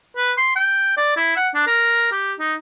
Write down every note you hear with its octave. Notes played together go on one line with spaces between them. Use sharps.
B4
C6
G5
D5
E4
F#5
D4
A#4
G4
D#4